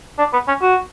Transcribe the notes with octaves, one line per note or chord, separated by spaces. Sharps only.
D4
B3
C#4
F#4